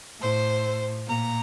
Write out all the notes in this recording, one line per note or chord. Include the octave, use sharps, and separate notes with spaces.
A2 C5
A#2 A#5